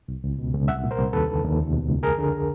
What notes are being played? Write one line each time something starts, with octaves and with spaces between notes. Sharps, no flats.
C2
C#2
B2
C#2
C2 E5 F#5
A#2
A#4 C5
C2
D#2 A4 B4
D3
D#2
C#2
B2
C#2
F2 G#4 A#4
D3